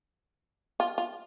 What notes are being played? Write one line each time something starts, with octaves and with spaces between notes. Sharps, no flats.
F4
F4